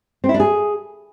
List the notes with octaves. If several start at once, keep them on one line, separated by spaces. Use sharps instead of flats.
C4
E4
D4
G#4